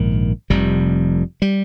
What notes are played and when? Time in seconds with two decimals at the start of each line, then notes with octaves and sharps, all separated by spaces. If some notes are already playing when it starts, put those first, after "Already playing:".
Already playing: A#1 G#2 D#3
0.50 F1 F2 C3 G3
1.42 G3